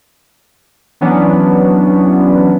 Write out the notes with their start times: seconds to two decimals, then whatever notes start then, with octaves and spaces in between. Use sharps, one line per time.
1.01 E3 F#3 B3 C#4 D4